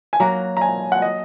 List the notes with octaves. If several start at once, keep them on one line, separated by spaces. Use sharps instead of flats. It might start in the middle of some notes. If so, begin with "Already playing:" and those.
G#5
F#3 A#3 F#4 A#5
A#5
G#5
F#5
D#5